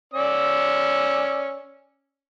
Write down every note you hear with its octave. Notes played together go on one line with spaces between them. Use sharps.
C#4 D5 E6